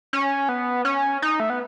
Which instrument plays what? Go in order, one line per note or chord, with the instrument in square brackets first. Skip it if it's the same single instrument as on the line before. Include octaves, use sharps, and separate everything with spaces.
[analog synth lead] C#4
B3
C#4
D#4
A3
B3